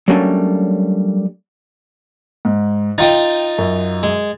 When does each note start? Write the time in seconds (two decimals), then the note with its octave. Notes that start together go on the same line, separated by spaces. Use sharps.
0.08 F#3 G3 A3 A#3 C#4 D4
2.45 G#2
2.98 D#4 F4 D#5 G5 A6
3.58 F#2
4.03 G#3